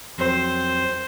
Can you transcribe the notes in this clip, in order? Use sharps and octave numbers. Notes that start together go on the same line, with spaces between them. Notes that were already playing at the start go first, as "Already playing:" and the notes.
F2 F#3 C4 C5